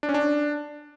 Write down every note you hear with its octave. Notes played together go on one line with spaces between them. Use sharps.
D4
C#4
D4